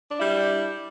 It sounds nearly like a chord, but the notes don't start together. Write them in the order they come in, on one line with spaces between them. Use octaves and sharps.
D4 E4 G3